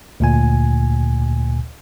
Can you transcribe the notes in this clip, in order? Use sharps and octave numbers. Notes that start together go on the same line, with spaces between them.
D2 A#2 G#5